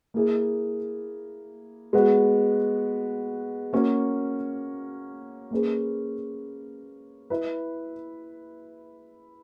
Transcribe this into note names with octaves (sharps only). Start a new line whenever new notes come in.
A#3 E4 G#4
G#3 B3 F#4
A#3 C#4 F#4
A#3 C#4 G#4 B4
E4 B4